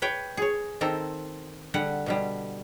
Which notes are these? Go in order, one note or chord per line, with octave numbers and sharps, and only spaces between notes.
B4 C#5 G5
G#4 C#5
D#3 C4 A4 A#5
D3 G3 F#5
B2 D3 G3